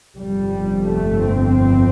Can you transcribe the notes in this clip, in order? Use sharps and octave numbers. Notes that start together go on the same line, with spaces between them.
G1 F2 C3 G3
A3
C4